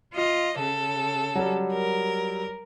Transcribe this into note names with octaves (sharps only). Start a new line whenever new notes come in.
F4 D#5
C#3 A4
F#3 G3
A#4